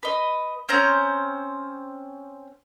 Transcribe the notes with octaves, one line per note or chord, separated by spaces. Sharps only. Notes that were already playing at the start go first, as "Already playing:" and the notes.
B4 D#5
C4 C#4 C5 A#5